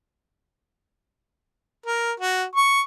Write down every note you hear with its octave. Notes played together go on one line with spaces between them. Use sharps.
A#4
F#4
C#6